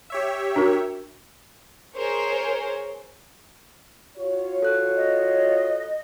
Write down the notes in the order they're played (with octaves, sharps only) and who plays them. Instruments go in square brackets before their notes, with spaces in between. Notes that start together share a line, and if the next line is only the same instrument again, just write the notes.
[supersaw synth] G4 C#5 E5
[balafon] D4 F#4 A#4
[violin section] G#4 A#4 C5 C#5
[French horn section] F4 F#4 C#5
[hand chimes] A4 F#6
[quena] D#5